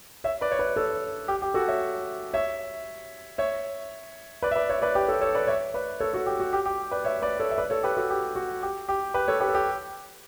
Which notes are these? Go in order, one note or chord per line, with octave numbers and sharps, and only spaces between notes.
C#5 E5
B4 D5
C#5
B4 D5
A4 C#5
G4
G4
F#4 A4
C#5 E5
C#5 E5
C#5 E5
B4 D5
E5
B4 D5
C#5 E5
B4 D5
G4 B4
A4 C#5
A4 C#5
B4 D5
C#5 E5
B4 D5
A4 C#5
F#4 A4
G4
F#4
G4
G4
B4 D5
C#5 E5
B4 D5
A4 C#5
E5
B4 D5
A4 C#5
G4 B4
F#4 A4
G4
F#4
G4
G4
G4 B4
A4 C#5
G4 B4
A4
G4